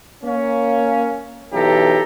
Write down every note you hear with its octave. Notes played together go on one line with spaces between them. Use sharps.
A#3 C#4
B1 E3 G4 A4 A#5